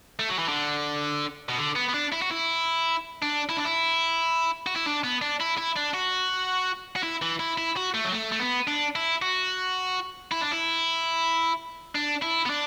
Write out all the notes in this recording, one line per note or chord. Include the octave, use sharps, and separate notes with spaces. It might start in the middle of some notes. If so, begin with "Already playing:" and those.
A3
F#3
E3
D3
B2
D3
B3
B3
D4
E4
F#4
E4
D4
E4
D4
E4
F#4
E4
D4
B3
D4
E4
E4
D4
F#4
F#4
E4
E3
E4
E4
F#4
A3
F#3
A3
A3
B3
D4
E4
F#4
E4
D4
E4
D4
E4
B3
D4